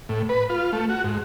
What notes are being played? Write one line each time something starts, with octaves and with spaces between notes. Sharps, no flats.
A2
B4
F4
A3
F#4
G#2